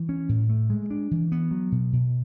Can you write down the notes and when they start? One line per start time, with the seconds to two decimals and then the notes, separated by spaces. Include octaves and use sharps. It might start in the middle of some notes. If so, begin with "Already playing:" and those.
Already playing: E3
0.09 C#4
0.29 A2
0.49 A3
0.70 G#3
0.90 D4
1.11 E3
1.32 B3
1.51 F#3
1.72 B2
1.93 B2